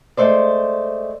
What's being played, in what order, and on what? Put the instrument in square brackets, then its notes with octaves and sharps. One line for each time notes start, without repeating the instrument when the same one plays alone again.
[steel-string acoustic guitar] G#3 A3 C5 D5